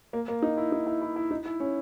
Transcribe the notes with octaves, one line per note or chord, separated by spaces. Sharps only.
A#3
A#3
D#4
E4
D#4
E4
E4
E4
D#4
E4
C#4